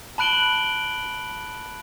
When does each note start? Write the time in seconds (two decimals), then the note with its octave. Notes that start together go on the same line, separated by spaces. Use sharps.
0.18 A5 B5 F#6 D7 F#7 G7